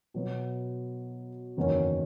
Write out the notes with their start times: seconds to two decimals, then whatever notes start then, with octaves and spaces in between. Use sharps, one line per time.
0.14 B2 F#3 B3
1.57 F#1 E2 D#3 F#3 C#4